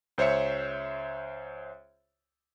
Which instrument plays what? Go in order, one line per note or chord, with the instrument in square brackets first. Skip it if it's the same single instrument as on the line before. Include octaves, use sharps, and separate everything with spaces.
[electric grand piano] C#2 C5 C#5 E5 C#7